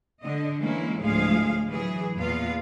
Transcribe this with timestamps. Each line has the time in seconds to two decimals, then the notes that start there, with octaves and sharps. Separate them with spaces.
0.22 D3 D#5
0.60 E3 G#3 A#3 C#4 E4
1.01 D2 A2 F3 G#3 G#4 F5
1.68 E3 F#3 G#4
2.16 E2 A#2 B3 F4 F5